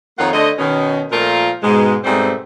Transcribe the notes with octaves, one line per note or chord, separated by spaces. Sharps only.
F2 D#3 A#3 F4 C#5 F#5
D3 A3 C5 D#5
B2 D#3 C#4
A#2 F3 A3 F4 A#4
G#2 B2 G#3
G#2 B2 G3 A3 C4